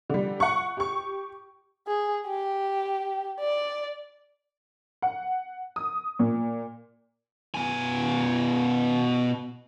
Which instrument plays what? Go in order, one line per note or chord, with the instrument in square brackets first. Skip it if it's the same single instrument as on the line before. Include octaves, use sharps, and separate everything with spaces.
[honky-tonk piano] D3 G3
F#5 C#6
G4 C#6
[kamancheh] G#4
G4
D5
[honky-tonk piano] F#5
D#6
A#2
[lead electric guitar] B2 G#5